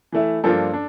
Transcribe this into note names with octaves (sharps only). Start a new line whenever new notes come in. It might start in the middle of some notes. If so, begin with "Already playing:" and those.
E3 A3 E4
G2 F3 A#3 D4 F4 A4
D4